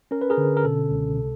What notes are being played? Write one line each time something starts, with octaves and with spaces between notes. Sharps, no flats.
C#4 A#4
B4
G#4 A#4
D3
A#4
B2 A4
C#2
C3